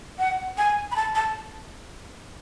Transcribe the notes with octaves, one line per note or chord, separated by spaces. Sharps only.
F#5
G#5
B5
A5
A5